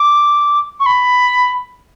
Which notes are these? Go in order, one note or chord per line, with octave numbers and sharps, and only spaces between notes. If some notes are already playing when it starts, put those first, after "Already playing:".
Already playing: D6
C#6
B5